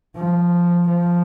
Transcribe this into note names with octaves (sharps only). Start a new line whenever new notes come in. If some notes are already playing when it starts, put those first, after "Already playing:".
F3
F3